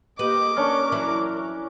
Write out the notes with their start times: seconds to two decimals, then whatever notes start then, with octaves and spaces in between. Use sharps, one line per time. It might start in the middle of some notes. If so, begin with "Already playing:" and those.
0.19 A#3 G4 B4 D#5 D6
0.57 C#4 D4 A#4 C#6
0.92 E3 F#3 E4